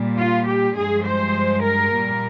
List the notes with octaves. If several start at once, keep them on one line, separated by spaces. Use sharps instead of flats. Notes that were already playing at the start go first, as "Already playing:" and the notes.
Already playing: A#2 G3
F4
G4
G2 F3 G#3 G#4
C5
A#4
A#2 G3